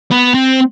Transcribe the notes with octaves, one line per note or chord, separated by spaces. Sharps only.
B3
C4